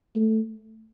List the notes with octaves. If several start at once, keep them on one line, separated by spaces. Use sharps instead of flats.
A3